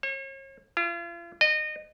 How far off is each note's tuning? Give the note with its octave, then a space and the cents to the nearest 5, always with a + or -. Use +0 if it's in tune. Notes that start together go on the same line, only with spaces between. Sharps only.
C#5 -40
F4 -40
D#5 -25